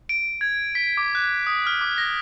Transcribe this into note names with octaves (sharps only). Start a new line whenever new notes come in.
D7
G#6
B6
D6
F#6
D#6
F6
D6
A#6